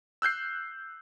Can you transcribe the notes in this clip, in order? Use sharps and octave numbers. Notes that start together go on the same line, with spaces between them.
E6 F#6 G6 C7